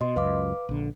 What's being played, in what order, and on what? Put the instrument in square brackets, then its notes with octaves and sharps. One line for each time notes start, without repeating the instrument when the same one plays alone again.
[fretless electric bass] B2 [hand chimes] D#5 C6
[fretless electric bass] C#2 F#2 [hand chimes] B4 F5 D6
[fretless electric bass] A#1 D3